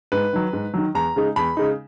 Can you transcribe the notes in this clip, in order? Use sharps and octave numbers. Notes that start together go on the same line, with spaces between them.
G#2 B4
D#3 F#3
G#2
D#3 F#3
E2 A#5
C#3 G#3 D#4
E2 B5
C#3 G#3 D#4